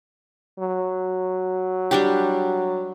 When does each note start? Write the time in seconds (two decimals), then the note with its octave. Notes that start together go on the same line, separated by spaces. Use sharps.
0.59 F#3
1.91 G3 D4 G4